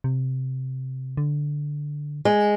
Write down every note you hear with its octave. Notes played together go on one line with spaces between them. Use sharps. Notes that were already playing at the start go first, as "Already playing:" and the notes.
C3
D3
G#3